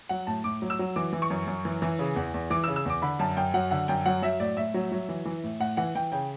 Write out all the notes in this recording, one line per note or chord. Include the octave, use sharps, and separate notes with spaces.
F#3 F#5
A2 A5
A2 D6
F#3
E6
F#3
E3 D6
E3
C#6
F#2
F#2
E3
E3
C#3
E2
E2
E3 D6
E6
C#3
E6
E2 D6
D3 B5
F#2 A5
F#2 G5
F#3 F#5
D3 F#5
F#2 G5
F#3 F#5
F#3 E5
A2 D5
A2 E5
F#3
F#3
E3
E3
A2
A2 F#5
E3 F#5
E3 G5
C#3 G5